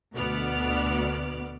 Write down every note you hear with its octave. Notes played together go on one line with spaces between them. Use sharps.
D2 B2 B3 D5 F6